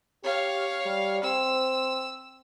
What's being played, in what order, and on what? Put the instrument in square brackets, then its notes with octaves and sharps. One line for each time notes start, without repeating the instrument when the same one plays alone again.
[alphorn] G4 [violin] C#5 F5
[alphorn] G3
[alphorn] C4 [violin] E6